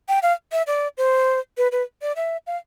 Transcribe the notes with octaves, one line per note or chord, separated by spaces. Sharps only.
G5
F5
E5
D5
C5
B4
B4
D5
E5
F5